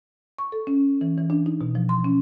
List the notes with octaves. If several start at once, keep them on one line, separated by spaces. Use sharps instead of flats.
C#6
A4
C#4
E3
E3
D4
D#4
B2
F3
C6
C#4